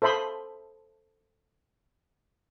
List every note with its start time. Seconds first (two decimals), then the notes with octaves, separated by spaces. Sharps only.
0.02 A4 C5 E5 B5 C6 D#6